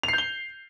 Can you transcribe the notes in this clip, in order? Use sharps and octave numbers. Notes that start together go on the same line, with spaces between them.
G6 C7 F7 G7